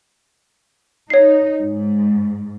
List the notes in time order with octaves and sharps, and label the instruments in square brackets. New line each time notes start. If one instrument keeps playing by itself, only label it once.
[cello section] D#4 [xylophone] C#5 C7
[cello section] G#2